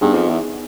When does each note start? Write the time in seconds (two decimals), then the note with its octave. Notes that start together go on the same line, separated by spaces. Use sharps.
0.01 G2 B3 D#4 G#4
0.15 F2
0.29 E2